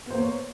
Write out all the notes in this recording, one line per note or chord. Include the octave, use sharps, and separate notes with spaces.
A#3 B3 C5 C#5